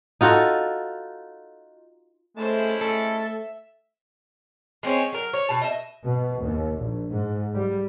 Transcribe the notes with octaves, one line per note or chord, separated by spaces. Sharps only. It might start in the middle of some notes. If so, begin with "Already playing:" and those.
D#4 F4 F#4 A4
G#3 A3 C#4 E4 C5 A5
A3 A4 E5
G#3 C4 C#4 C#5
F#3 A#4
C#5
B2 A5
D#5 E5
B2
D#2
A#1
G#2
G3